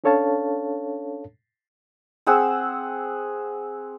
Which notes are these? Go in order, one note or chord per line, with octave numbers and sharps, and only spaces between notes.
C#4 D4 A4 C#5 F5 A5
C4 G#4 F#5 E6